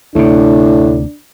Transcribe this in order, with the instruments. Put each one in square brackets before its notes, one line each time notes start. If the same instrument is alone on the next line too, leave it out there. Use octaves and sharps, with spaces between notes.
[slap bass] D2 C3 [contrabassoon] A2 [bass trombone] D4